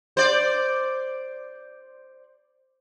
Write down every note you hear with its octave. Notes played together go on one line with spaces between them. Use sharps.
C5 D5